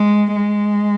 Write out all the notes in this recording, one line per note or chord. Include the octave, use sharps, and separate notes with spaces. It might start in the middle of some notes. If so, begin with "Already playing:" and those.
Already playing: G#3
G#3